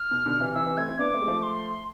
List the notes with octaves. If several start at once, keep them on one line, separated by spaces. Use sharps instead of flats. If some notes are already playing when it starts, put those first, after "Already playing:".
Already playing: F6
B2
B2 D3
C3 E3
C3 E3 E6
C3 E3
A3 C4 G#6
C4 E4
B3 D4 D6
A3 C4
G#3
F3 A3
C6